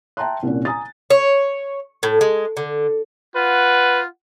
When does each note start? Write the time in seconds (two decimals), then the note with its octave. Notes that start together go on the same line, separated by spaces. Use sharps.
0.17 E5 G5 A5 A#5 C6 F#6
0.43 C2 A#2 C#4
0.65 G#5 A#5 D#6 A6
1.10 C#5
2.03 A2
2.21 G#3
2.57 D3
3.36 F4 B4 F#5